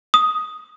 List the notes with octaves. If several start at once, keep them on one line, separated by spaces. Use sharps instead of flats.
D#6